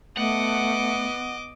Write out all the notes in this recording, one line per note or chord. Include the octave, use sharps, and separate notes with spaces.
A3 B3 D#5 F#5 D6